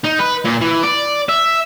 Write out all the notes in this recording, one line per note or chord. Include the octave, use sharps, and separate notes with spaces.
D#4
B4
A#2
E3
D5
E5